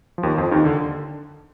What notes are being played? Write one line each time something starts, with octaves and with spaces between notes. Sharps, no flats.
F3
D#2 D#3
F2 F3
D#2 D#3
D3